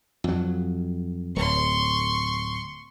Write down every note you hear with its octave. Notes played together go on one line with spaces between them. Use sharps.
F2 F#3
D1 C6 C#6